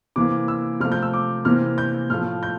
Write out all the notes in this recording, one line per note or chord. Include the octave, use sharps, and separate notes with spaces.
C3 E3 A#3 D6
E6
C3 F3 A3 F6
G6
E6
D6
C3 E3 A#3 F6
G6
A2 F3 A3 F6
G6